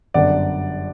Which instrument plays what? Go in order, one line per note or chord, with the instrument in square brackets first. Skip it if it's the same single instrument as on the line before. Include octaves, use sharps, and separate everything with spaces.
[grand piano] G1 F#2 D3 D5 F#5